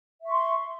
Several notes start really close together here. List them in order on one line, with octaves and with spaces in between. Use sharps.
E5 C#6 C6